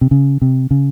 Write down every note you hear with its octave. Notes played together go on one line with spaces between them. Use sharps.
C3
C#3
C3
C#3